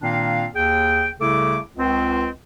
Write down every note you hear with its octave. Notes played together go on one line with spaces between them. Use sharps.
A#2 D#3 A#3 C4 D4 F5
D#2 G#4 G5
C2 C#3 A3 E4 A4 D6
C#2 C4